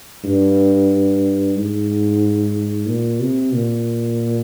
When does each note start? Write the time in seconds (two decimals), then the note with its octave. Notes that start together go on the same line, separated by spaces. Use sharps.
0.24 G2
1.56 G#2
2.86 A#2
3.20 C3
3.53 A#2